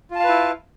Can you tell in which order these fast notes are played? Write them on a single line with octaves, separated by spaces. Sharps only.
F4 A5 F5 B4 E4